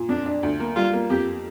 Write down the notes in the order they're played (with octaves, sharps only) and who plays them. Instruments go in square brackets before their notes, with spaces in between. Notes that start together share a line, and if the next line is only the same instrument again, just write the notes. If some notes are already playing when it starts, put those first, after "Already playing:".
Already playing: [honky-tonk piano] A#2
[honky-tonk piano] F2 [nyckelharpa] D4
[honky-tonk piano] D4
D2
A#3
[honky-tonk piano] G3 [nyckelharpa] F4
[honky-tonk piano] A#3
[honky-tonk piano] F2 [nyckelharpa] G4